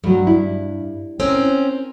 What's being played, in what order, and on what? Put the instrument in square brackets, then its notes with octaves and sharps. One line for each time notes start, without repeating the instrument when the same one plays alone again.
[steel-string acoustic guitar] G2 [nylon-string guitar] F#3 A3
[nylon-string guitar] E4
[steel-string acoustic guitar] C4 C#4 A#4